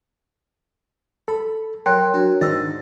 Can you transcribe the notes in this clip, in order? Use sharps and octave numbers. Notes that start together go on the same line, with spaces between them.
A4 B5
F#3 A#4 G5 C6 F#6
F#3 D4
G#2 D#3 D4 C5 D#5 A#5 E6 A6